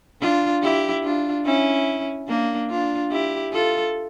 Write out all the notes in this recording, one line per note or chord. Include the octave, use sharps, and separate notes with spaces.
D4 F4
E4 G4
D4 F4
C#4 E4
A#3 D4
D4 F4
E4 G4
F4 A4